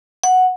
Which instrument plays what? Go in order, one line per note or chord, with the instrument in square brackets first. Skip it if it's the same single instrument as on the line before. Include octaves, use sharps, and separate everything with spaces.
[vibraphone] F#5